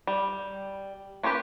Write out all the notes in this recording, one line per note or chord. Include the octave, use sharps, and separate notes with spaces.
G3
A#3 C#4 F4 G4 B4